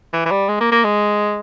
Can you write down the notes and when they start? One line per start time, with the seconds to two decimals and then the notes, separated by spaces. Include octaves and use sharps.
0.13 E3
0.26 E3
0.31 G3
0.49 G#3
0.61 A#3
0.72 A#3
0.84 G#3